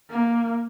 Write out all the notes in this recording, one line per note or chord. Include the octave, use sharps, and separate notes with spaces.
A#3